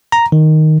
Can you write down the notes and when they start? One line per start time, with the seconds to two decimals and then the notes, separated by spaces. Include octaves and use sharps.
0.12 A#5
0.32 D#3